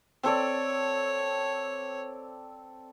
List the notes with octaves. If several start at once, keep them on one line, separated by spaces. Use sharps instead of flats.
C4 A4 C#5 D5